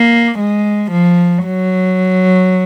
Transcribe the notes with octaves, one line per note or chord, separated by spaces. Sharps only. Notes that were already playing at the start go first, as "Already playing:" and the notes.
Already playing: A#3
G#3
F3
F#3